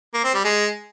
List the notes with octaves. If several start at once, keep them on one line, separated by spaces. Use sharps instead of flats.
A#3
C4
G3
G#3